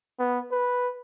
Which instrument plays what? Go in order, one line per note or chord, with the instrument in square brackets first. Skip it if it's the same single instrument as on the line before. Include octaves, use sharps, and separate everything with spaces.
[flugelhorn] B3
B4